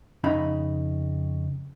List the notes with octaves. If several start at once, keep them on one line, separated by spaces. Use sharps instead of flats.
F2 C#3 D#4 E5 B5